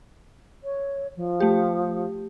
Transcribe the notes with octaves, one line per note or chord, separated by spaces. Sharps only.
C#5
F3
A3 G4